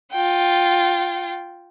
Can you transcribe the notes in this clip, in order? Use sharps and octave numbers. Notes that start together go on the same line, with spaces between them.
F4 G5